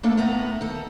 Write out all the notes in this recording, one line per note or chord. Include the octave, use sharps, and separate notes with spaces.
A3 A#3 D4 A4
A2 A3 B3 A#5
D#3 A4